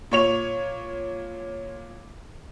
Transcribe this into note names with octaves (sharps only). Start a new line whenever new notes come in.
A#2 C#5 F7